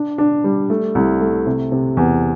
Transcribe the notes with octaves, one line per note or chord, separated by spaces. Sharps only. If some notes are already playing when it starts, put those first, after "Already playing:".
Already playing: D4
D4
G3
A3
C2
A3
C3
C3
E2